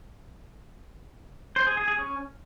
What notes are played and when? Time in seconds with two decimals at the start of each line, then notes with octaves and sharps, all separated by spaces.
1.56 C5
1.67 G#4
1.77 G#4
1.88 G#4
1.98 C#4